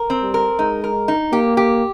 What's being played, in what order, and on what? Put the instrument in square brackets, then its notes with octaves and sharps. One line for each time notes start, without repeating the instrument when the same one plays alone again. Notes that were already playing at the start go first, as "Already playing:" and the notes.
Already playing: [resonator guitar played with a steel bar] A#4
C4
[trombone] G3
[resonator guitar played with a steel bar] A#4
[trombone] G#3 [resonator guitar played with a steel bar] D#4
[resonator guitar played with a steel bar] A#4
D#4
[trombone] A#3 [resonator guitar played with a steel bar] G4
[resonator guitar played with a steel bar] G4